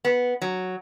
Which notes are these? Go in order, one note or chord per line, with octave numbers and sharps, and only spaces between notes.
B3
F#3